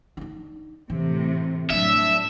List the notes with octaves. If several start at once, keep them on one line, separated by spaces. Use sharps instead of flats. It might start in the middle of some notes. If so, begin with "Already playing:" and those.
D4 D#4
A2 C3 E3
A2 F#3 G3 D4 E5